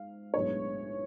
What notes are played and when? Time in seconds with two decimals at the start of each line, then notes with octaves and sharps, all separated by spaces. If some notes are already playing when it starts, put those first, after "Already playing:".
Already playing: G#2 F5
0.34 B1 A2 G#3 B3 D4 C#5